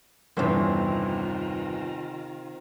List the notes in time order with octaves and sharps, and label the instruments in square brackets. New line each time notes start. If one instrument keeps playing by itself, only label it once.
[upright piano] G1 E2 [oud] C3 C4 C#4 [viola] D#3 F4